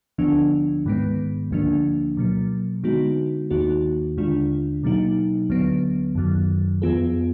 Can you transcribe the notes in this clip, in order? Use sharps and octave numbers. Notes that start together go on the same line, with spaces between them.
D2 D3 F3 B3 D4
G#2 D#3 G#3 B3
D2 D3 F3 A#3 D4
B2 F#3 A#3
D3 G#3 B3 D#4 F#4
D#2 D#3 A#3 D#4 F#4
D#2 D3 G#3 D4 F4
B2 F#3 A#3 D#4
D2 D3 F#3 B3
F#2 D#3 F#3
F2 F3 B3 F4 G#4